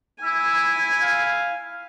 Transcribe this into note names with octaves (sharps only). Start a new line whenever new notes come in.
E4 G#5 E6
F5